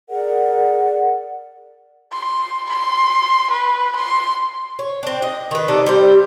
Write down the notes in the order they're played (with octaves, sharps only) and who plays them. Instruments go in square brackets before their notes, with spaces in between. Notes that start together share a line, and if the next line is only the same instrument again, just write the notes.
[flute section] G#4 A#4 D5 F#5
[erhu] C6
C6
B4
C6
[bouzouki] C#5
C4 D4
D#5
D#3 B4
C3 D#4 A4 D5
G3 G4 C5